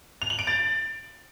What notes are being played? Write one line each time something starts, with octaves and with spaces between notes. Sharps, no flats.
F7
F#7
D7
A6